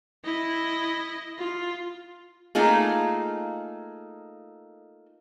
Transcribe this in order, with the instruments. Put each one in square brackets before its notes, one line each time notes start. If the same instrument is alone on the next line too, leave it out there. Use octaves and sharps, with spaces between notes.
[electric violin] E4 D#5
F4
[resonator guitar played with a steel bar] A3 A#3 D#4 F4 G#4